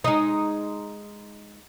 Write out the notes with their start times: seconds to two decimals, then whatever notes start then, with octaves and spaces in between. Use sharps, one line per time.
0.04 G#3 D#4